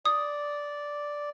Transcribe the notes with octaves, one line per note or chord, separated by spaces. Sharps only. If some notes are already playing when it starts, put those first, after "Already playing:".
D5 D#6